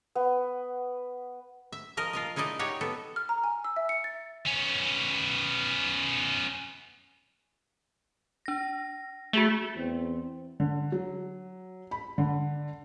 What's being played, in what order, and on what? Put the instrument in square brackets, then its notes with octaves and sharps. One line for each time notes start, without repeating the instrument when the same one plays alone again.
[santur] B3
[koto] E5
F3 A#4 D#5
F4 A#4 D#5
G#3 D#4 E4 D5 D#5
D#4 G4 C#5 D5 F#5
B3 A4
[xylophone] F6
A#5
G#5
E6
E5
C#7
A6
[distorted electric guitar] B3 C#4
[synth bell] D4 A#6
[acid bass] A3 [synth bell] F#4 G#4 E5
[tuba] E2 [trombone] C4
[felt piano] D3
F#3
B5
D3